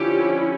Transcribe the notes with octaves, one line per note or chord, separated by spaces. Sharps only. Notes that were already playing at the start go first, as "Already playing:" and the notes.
Already playing: D3 F3 C#4 E4 G4